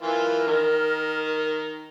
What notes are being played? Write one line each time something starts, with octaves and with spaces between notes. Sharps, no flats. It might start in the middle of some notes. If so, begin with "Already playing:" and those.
E3 F4 A#4
D#3